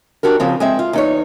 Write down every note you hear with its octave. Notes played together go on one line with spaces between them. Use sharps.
D4 F#4 G4 A#4
C#3 F3 C4
G#3 C4 E5
F4
E2 D#4 C#5